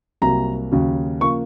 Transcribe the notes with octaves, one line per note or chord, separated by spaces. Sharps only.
C2 C3 F#3 A#3 A#5
D#2 C#3 F#3
C#3 F3 A#3 C#6